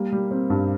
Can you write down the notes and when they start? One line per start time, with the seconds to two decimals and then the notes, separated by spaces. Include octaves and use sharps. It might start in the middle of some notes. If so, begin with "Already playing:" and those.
Already playing: G3 A#3
0.13 G3
0.31 C4
0.50 G2